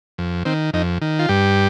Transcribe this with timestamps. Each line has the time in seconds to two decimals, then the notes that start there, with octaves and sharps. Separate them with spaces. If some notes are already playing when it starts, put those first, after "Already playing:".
0.18 F2
0.45 D#3 C4
0.73 F2 D#4
1.02 D#3
1.19 F4
1.29 G2 G4